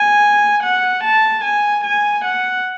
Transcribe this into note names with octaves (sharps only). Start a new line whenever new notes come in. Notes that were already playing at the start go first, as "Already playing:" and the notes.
Already playing: G#5
F#5
A5
G#5
G#5
F#5